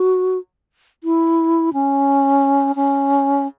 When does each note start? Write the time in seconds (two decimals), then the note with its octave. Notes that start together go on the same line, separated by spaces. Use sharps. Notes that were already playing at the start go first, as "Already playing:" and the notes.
Already playing: F#4
1.04 E4
1.73 C#4
2.76 C#4